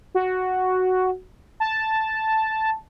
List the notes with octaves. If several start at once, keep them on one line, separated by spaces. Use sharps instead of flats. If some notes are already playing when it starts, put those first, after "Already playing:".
F#4
A5